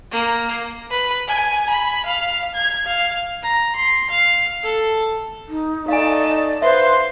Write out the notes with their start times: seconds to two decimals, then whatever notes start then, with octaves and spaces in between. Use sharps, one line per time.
0.11 A#3
0.91 B4
1.28 G#5
1.70 B5
2.06 F5
2.55 G#6
2.86 F5
3.43 A#5
3.76 C6
4.10 F5
4.64 A4
5.49 D#4
5.88 A3 D#4 D5 F5 G#5 E7
6.29 D5
6.62 B4 C5 E5 F5 C6